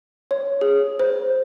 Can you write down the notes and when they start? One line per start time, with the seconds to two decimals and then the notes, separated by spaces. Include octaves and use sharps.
0.31 C#5
0.61 G#4
0.99 C5